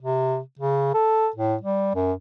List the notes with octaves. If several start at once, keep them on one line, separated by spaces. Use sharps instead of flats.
C3
C#3
A4
A2
G3
F#2